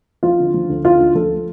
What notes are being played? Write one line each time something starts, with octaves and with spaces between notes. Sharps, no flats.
F3 F4
D3
F3
D2
D3 F4
D2
F3 A4
A3